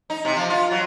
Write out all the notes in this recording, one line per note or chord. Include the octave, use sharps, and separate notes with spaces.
D#4
C3
F3
F4
F#3